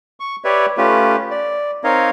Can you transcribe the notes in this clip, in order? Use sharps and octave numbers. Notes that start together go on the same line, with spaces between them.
C#6
G4 B4 C#5 D5 E5
A3 C#4 F4 G4 B4
D5
C4 D#4 A#4 C#5 D#5 F5